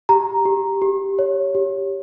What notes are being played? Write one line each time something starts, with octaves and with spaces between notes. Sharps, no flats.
G4 A#5
G4
G4
C#5
G4